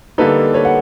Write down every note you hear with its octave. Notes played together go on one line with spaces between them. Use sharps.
D3 G3 A#3 D#4 A4 B4
B4 C#5
F#5